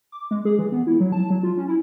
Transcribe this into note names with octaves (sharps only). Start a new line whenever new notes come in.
D6
G#3
G#4
E3
B3
E4
F#3
A5
F#3
F4
C#4
E4